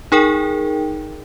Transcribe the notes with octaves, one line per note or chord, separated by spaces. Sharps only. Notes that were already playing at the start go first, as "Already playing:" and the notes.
D#4 G#4 A#4 G5